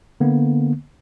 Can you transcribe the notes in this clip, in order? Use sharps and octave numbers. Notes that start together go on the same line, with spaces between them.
D3 A#3 B3